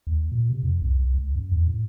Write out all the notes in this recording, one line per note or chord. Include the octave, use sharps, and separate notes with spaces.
D#2
A#2
C3
F2
C2
C2
C#2
F#2
E2
A2